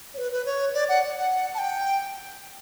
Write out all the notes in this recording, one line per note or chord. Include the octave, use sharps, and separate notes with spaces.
C#5
B4
B4
C#5
D5
F#5
F#5
A5
G5